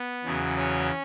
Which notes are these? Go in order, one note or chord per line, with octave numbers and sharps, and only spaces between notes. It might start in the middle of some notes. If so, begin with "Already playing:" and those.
Already playing: B3
E2 C#3 F#3
C#4